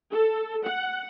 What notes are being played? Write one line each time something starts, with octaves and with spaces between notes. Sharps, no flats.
A4
F#5